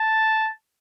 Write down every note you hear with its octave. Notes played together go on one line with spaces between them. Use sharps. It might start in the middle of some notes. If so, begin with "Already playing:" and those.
Already playing: A5